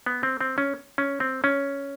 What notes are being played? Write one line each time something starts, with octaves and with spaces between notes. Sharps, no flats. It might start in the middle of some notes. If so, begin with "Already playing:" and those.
B3
C4
C4
C#4
C#4
C4
C#4